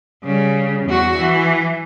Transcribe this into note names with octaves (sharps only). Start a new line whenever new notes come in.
C#3 G3
E2 F#4
E3